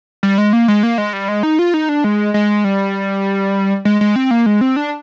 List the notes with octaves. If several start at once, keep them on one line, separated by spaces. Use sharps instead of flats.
G3
G#3
A#3
G#3
A#3
G#3
G3
G#3
D#4
F4
D#4
D4
G#3
G#3
G3
G#3
G#3
C4
A#3
G#3
C4
D4